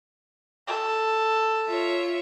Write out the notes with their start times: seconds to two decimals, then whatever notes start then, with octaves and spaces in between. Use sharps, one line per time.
0.67 A4
1.68 F4 C#5 E5